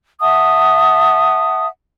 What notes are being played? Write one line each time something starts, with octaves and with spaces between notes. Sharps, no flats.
E5 F#5 A5 D#6